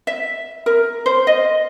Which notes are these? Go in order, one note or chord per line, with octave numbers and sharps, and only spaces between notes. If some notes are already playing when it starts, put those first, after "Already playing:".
E5
A#4
C5
D#5